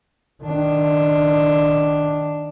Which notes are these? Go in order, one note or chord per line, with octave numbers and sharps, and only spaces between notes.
D#3 D4